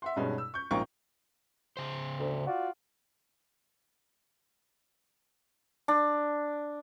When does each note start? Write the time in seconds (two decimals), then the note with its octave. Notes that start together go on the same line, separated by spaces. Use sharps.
0.02 E5 F#5 C6
0.16 G2 B2 G3 G#3 C#4 D#4
0.38 E6
0.54 C#6 G6
0.71 A#1 G#2 F4 A#4 G5 C#6
1.77 C#3 C5
2.20 D2
2.47 F4 F#4 D5
5.88 D4